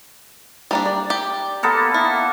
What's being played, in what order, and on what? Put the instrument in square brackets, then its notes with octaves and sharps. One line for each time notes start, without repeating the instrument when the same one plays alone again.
[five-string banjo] G3 A#3 D4
[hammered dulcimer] D5
[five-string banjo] G4
[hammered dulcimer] A#3 B3 A4
[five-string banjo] E4